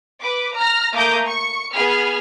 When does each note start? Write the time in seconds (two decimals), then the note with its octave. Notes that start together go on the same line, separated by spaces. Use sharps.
0.21 B4 D6
0.55 A#5 F6 A#6
0.93 A3 A#3 A#5 D6 D#6 G6
1.26 C#6 C#7
1.72 B3 G#4 B5 F6